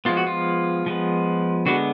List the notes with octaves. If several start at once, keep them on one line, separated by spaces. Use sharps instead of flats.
F3 G#3 B3 F4
F#4
F4
F3 G#3 B3
D3 G#3 B3 F#4